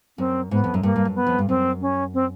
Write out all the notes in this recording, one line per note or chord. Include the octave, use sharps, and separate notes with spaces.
F#2 C4
G#2 B3
F2
F#2
G2 A#3
G2
F#2
B3
F2
G2
F#2 C4
C#4
C4